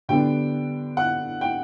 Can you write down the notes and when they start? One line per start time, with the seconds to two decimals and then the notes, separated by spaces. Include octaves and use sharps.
0.09 D3 G3 B3 D4 G5
0.97 F#5
1.41 G5